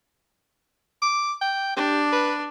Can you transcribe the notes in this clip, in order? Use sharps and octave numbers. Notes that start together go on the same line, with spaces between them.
D6
G5
D4 G4
B4